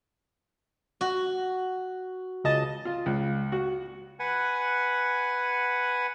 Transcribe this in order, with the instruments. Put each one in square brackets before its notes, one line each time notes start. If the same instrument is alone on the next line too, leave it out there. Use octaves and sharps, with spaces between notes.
[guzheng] F#4
[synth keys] C#2 D#5 A5
[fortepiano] F4
C#2
F#4
[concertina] B4 F#5 G#5